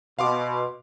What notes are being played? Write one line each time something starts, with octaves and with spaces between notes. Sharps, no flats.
B2 F5 C6 D6